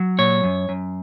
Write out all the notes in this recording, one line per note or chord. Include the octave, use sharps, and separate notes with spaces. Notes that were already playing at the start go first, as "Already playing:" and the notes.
Already playing: F#3
A#2 C#5
F#2
F#2